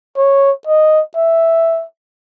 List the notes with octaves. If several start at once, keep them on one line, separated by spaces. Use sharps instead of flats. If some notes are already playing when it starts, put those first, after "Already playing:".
C#5
D#5
E5